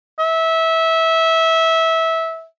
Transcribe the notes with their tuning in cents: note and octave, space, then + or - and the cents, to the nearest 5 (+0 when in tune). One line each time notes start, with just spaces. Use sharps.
E5 -20